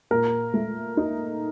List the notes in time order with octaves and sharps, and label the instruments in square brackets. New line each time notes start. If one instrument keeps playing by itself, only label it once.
[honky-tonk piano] A#2 [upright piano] A#4
[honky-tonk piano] A3
D#4